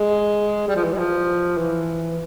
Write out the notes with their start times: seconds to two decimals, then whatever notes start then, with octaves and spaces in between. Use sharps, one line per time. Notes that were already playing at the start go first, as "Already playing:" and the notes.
Already playing: G#3
0.68 G3
0.75 F3
0.84 E3
0.93 G3
0.98 F3
1.57 E3